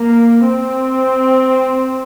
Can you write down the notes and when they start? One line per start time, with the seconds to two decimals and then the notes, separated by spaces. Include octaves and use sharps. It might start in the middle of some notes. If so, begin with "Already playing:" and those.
Already playing: A#3
0.47 C4